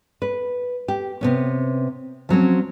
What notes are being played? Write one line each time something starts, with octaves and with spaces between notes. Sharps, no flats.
B4
G4
C3 B3 C#4
F3 F#3 C4 C#4